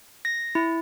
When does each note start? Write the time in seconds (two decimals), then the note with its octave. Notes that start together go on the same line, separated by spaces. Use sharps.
0.25 A#6
0.55 E4